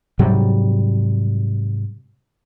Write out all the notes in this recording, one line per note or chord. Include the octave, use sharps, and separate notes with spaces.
G#2 C3 F#3 G3